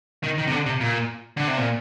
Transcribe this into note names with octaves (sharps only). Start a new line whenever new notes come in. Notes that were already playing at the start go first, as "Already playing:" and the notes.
D#3
D#3
C3
D3
C3
A#2
D3
C3
A#2